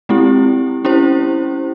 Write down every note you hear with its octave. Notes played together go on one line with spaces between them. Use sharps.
G#3 C4 E4 G4
C#4 E4 G4 C5